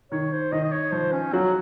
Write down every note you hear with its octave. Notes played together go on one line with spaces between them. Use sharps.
D#3 C#5
C5
D#3 D#5
D#5
C#5
F3 C5
C#4
F#3 F#4